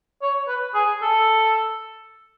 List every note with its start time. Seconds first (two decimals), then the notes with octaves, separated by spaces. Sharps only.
0.22 C#5
0.48 B4
0.74 G#4
1.02 A4